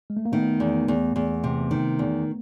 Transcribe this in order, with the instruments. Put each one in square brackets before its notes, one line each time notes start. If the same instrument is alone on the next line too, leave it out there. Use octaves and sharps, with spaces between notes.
[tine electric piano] G#3
A3
A#3
[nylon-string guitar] D#3 [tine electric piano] A3 B3
[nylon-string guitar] E2
E2
E2
C3
D#3
E2